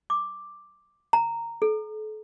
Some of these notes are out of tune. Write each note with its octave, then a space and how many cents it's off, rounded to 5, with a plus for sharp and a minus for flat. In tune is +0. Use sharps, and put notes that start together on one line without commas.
D6 +5
A#5 -10
A4 -35